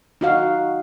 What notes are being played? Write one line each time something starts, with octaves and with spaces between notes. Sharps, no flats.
D#4 F#4 F5